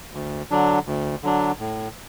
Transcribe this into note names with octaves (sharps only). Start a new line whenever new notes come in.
D2
D3 F#3 D4
D2
D3 F#3 D4
A2